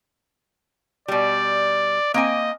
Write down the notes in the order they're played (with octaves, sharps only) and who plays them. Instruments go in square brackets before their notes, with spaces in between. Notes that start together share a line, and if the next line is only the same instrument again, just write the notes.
[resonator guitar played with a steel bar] B2 G3 [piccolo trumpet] D5
[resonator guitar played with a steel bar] A#3 C4 G#5 [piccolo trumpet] D#5